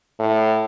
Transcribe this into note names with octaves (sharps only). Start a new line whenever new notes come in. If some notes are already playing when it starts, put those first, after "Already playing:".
A2